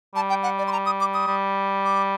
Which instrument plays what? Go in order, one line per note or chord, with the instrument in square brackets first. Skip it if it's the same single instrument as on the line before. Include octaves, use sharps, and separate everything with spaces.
[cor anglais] G3 [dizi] A5
[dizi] G5
F#5
D5
C6
A#5
D#6
D6
D#6
[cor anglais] G3
[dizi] D6